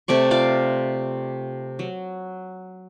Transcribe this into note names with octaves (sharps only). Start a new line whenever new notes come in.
C3 A3 D5 C#6
F4 D5 F5
F#3